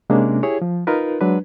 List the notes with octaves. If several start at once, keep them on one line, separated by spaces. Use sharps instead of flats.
C3 G#3 A#3 C#4 D4
E4 G4 G#4 C#5
F3
D#4 F4 A#4 B4
F#3 G#3 D4 B4